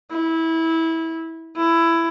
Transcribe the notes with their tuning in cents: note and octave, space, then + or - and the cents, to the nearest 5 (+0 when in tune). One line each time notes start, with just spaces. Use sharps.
E4 -20
E4 +15